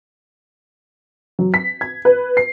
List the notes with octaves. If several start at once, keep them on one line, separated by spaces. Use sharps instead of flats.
F#3
B6
G#6
B4
C7